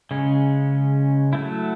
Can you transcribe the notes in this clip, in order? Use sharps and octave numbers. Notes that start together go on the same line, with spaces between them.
C#3 G#3 C#4
F#3 A3 E4